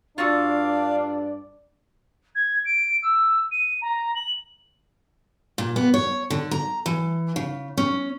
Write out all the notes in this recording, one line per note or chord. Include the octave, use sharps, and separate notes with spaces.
G2 D4 F4 F#4 A4 D5 F5
G#6
D7
E6
D#7
A#5
F#7
A#2
B3
C#5
D3
A#5
E3
C#3
C#4